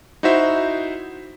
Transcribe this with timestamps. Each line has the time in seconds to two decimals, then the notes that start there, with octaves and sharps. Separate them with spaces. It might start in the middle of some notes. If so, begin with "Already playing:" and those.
0.23 D#4 E4 F#4 C5 E5